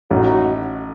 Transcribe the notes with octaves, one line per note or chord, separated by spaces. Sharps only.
A1 D#4 F#4